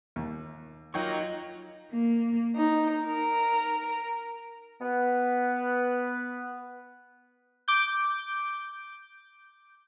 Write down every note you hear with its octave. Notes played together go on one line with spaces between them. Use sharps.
D#2
F#3 A#3 D#4 F4 G5 C#6
A#3
D#4
A#4
B3 B4
D6 G6